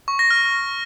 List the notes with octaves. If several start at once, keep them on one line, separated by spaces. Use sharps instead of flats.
C#6
A#6
F6